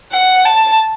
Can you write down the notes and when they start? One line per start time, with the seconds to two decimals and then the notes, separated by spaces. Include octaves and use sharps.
0.12 F#5
0.45 A5